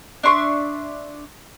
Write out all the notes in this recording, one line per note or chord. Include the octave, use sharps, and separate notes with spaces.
D4 E5 C6 C#6